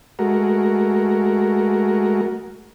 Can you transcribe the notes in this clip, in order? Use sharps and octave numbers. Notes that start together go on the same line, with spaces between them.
G#3 A3 F#4 A#4